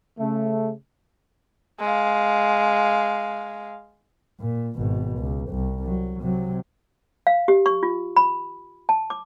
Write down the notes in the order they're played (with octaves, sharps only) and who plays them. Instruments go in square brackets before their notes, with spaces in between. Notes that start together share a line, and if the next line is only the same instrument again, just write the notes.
[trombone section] C#3 A3
[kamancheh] G#3 F5
[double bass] A#2
G#1 B2
C#2
C2
F#3
C3 F#3
[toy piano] F5
G4
C#6
F4
B5
A5
D6